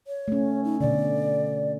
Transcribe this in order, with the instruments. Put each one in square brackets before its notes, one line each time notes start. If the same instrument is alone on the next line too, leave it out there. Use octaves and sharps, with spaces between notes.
[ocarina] C#5
[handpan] A3 C#4
[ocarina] D#4
[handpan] B2 D3 [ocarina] D5